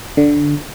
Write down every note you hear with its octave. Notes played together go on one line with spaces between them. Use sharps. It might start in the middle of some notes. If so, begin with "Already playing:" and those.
D3